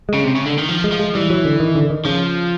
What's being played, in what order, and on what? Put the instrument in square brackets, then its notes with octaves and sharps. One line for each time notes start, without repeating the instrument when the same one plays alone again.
[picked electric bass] G#3
[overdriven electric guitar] C#3
C3
C#3
D3
D#3
F3
[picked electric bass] G#3
[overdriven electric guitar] F3
[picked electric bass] G#3
[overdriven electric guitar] E3 [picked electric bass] G3
[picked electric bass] F#3
D3
D#3
D3
D#3
[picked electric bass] C#3 [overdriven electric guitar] F3